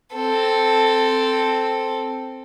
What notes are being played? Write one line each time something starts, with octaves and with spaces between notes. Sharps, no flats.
C4 A4